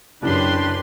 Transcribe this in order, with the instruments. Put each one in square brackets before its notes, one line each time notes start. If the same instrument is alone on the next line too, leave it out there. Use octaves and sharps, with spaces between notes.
[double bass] F#2 [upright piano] C#3 E3 [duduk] D4 [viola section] G4 B4 C6